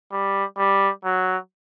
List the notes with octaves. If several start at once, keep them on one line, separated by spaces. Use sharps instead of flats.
G3
G3
F#3